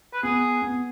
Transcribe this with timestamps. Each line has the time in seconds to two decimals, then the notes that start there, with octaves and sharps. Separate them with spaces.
0.13 B4
0.23 B3 G#4
0.62 B3